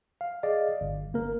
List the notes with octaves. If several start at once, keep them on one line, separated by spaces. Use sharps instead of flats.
F5
G#4 D5 D#5 F5
G1
G1 A#3 A#4